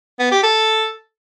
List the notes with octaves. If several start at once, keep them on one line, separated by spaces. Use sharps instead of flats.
B3
G4
A4